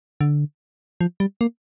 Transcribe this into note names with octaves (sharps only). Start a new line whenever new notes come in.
D3
F3
G3
A#3